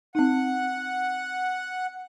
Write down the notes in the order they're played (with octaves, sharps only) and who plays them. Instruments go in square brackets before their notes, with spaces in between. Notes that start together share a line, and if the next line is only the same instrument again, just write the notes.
[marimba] C4 D#4 [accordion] F#5